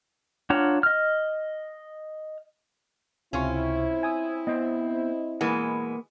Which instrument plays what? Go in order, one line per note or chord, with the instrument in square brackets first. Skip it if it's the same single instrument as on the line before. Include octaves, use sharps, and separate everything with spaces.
[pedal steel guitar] D4 F4 C#5 F#5 A#5
D#5 F6
[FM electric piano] C#2 C3 C#6 [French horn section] C4 E4 [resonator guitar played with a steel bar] C#4 F4
[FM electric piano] G#5 D#6 E6
[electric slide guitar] B3 C5 [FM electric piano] D#5
[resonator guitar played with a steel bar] B2 E3 G#3 [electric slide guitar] A#3 A#4 F#5